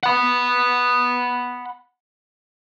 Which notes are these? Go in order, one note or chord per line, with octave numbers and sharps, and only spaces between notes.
F#5 B5